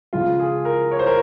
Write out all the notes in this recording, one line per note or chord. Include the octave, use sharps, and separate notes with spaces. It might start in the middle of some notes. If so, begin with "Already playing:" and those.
C#2 C#3 F3 F4
G#4
A#4
C#5
C5
A#4